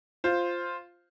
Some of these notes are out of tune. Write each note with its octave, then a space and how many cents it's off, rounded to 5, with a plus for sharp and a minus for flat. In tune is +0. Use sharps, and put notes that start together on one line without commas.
F4 +0 C5 +0